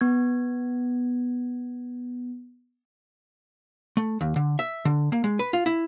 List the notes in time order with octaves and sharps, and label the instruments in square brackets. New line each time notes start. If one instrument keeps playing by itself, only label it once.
[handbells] B3 G#6
[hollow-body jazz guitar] A3
D#2
D3
E5
D3
A#3
G#3
B4
F4
E4